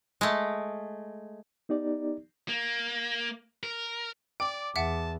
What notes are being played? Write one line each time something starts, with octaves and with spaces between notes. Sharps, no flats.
G#3 A3
B3 D#4 G4 D5
A#3
A#4
D5 G5 D6
E2 E5 F#5 A5